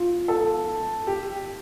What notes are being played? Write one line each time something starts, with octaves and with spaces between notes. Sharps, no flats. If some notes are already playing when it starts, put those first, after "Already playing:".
Already playing: F4
A4
G4